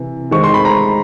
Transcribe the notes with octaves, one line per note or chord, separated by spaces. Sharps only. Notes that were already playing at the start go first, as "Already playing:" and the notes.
Already playing: C3 E3
D#3 G#3 C4 C#6
C6
B5
A#5